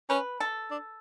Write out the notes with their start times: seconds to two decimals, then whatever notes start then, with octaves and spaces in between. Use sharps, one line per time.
0.09 C#4 B4
0.40 A4
0.71 D4